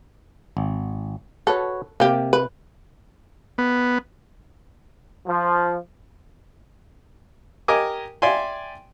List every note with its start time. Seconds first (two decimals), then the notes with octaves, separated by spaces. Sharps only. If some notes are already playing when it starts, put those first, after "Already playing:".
0.57 G#1
1.47 F#4 A4 B4 C#5
2.00 C3 A#3 G4
2.33 B4
3.58 B3
5.27 F3
7.68 G4 A#4 D#5 G#5 D6
8.22 D5 E5 G5 G#5 C6